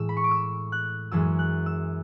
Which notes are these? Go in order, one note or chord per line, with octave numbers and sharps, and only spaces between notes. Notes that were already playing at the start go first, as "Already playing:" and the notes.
Already playing: A2 E3 G#3 E6
B5
C#6
D6
E6
F#6
F#2 E3 G#3 E6
F#6
E6